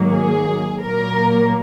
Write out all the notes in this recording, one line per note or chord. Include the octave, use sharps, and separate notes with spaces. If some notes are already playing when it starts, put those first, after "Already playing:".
Already playing: G#2 D#3 F#3 A#3
G#4
A#2 F#3 A#3 A#4